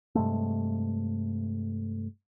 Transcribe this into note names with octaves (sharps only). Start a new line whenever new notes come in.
G2 C3 G#3 A3